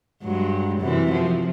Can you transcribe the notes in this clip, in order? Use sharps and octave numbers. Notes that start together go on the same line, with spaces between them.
G2 F#3 G#3
F#2 C3 E3
F3